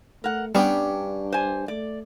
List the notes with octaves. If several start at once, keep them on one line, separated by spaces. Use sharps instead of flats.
A3 A#4 F#5
G2 G3 B3 C#4 D4 G4 G5
C5 G#5
A3 D5